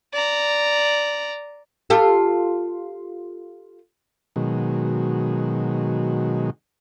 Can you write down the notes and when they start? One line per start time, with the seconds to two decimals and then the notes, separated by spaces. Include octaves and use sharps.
0.13 D5 A#5
1.90 F4 G4 A4
4.36 B2 D#3 F#3 G#3